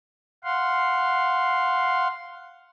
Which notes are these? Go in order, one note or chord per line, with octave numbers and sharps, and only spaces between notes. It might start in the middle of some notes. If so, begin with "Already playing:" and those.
F5 F#5 C6